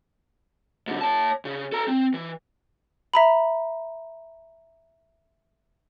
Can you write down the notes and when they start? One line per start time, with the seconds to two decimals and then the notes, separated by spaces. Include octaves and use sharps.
0.88 G#2 D3
1.01 C#5 A5
1.45 C#3
1.72 A4 A#5
1.88 C4
2.14 E3
3.14 E5 A#5 B5